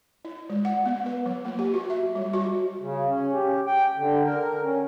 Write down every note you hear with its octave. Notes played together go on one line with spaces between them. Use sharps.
E4
G#3
F#5
B3
B4
F#3
A#3
G4
F#4
E5
G3
F#4
C#3
C#4
G4
G5
D3
A#4
C#4